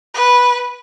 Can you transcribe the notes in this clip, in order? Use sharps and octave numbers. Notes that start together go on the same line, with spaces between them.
B4